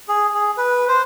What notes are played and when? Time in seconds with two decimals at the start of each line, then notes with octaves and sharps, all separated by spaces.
0.08 G#4
0.34 G#4
0.57 B4
0.88 C5